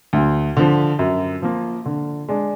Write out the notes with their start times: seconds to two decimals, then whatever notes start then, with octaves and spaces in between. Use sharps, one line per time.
0.13 D2
0.57 D3 F3
0.99 F#2
1.42 F3 A#3
1.86 D3
2.29 G#3 D4